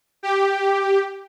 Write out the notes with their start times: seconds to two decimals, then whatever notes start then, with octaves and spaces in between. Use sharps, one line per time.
0.23 G4